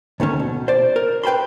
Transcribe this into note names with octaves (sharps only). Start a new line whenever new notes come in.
D2 D#3 A3 C#4
B2
C5 D5
A#4
B4 G5 A5 B5 C6